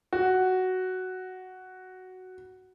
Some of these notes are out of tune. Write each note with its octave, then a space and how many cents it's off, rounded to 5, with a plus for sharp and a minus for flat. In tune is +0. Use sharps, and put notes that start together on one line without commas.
F#4 +5